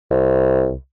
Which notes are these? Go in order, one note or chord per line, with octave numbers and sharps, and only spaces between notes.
C2